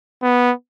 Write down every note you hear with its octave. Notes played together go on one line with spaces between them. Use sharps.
B3